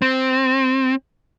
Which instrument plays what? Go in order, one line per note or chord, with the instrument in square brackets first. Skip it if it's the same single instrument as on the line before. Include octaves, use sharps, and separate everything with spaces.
[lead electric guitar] C4